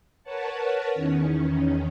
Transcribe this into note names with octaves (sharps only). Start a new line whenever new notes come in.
A#4 B4 C#5 F#5 A5
E2 D#3 C#4